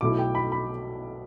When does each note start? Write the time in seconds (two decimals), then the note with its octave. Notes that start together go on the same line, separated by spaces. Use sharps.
0.01 B1 B2 A3 E4 D6
0.19 G5
0.35 B5
0.52 B5